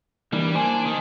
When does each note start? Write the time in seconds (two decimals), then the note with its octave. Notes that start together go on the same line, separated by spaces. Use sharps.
0.33 E3 G3 A#3 D4
0.55 A#3 D4 C5 G#5
0.86 D#3